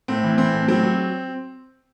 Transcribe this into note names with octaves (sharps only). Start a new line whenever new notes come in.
A2 C4
E3
E3 C4
A2
F#3 C4
F#3